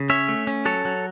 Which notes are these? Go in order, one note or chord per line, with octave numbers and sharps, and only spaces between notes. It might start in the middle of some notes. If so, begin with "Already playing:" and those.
Already playing: C#3
C#4 C#5 E5
A3
C#4
F#3 A4 C#5
F#3